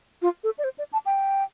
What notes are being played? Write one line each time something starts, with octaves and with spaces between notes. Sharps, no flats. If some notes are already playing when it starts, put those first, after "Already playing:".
F4
A4
D5
C5
D5
A5
G5